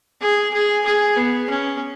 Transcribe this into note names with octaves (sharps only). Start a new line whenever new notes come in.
G#4
G#4
G#4
B3
C#4